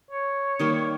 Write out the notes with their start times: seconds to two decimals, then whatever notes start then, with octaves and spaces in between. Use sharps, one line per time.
0.11 C#5
0.59 D#3 G3 A#3